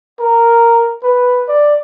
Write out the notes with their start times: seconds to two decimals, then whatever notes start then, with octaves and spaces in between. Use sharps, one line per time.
0.20 A#4
1.03 B4
1.48 D5